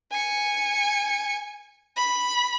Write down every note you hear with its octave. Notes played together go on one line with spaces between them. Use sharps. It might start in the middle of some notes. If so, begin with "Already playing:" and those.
G#5 C#7
B5